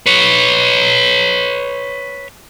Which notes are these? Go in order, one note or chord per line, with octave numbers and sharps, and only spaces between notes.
B4 C#5